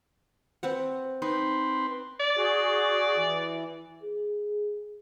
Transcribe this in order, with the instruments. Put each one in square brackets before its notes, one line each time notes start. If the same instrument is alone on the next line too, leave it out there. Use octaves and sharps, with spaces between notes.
[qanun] C4 B4 F#5
[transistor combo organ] C4 B4 C6 [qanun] D#4
[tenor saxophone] D5
[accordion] F#4 G#4
E3
[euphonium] G#4